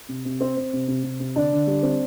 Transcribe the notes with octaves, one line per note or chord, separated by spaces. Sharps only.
C3
C3
C4 C5
C4
C3
C3
C3
C3
D3 D4 D5
D3
G3
C4